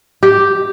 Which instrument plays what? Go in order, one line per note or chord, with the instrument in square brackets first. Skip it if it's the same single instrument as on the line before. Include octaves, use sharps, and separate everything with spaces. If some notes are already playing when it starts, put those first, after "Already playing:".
[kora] G4